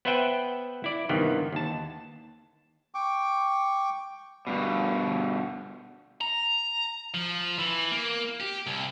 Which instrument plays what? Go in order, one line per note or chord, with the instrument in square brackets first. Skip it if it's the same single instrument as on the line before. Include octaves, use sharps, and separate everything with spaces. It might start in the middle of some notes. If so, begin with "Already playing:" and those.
[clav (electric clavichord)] B3 B4 C5 E5 F#5 G5
E4 D5
G2 C3 D#3 E3 B3
D#2 A5
[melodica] G5 C#6 D6
[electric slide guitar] G2 B2
[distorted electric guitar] A#5
F3
E3
A#3
G4
C2